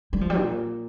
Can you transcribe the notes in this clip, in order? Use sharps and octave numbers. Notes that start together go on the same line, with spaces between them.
G3
F3
G3
A#2